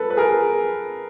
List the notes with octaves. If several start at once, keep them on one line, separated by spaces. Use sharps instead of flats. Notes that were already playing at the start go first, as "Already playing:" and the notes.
Already playing: A4 B4
B4
G#4 A#4